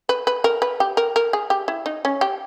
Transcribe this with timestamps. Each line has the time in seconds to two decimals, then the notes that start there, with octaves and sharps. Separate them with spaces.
0.09 B4
0.27 B4
0.44 A#4
0.62 B4
0.80 G4
0.97 A#4
1.16 A#4
1.33 G#4
1.50 G4
1.68 E4
1.86 D#4
2.05 C#4
2.21 G4